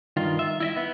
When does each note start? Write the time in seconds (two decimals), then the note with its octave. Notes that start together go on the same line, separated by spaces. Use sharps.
0.17 G2 D#3 F4
0.39 E5
0.60 E4 D#5 E5
0.76 B3